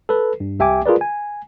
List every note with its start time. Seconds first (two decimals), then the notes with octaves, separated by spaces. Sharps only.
0.09 A4 B4
0.40 G2
0.59 C2 G4 E5 G5 G#5 D6
0.86 F4 G#4 A#4 B4 D5
1.01 G#5